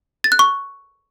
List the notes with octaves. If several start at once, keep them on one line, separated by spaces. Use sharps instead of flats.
A6
F#6
C#6